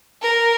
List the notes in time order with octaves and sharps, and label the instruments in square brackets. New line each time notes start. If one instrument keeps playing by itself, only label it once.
[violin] A#4